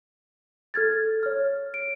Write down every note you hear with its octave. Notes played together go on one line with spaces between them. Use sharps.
A4 F6 G#6 A6
C#5 F6
D7